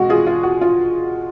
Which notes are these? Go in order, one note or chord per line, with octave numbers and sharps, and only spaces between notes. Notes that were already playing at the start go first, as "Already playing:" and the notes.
Already playing: B2 G#3 F#4
F4 G#4
F4
F#4
F4